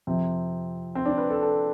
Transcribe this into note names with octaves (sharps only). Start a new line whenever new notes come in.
F2 C3 F3 C4
C4
D4
B4
A4
A4